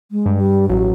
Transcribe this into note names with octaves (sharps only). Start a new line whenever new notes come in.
G#3
G2
G3
A1 F#3